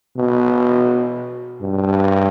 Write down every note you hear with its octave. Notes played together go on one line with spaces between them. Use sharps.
B2
G2